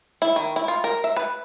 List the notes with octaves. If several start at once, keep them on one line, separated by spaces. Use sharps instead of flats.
E4
D#3
E4
F4
A#4
E5
B4